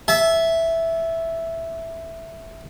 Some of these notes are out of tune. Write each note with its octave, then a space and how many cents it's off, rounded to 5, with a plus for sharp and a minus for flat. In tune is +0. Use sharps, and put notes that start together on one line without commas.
E5 +0 A5 -40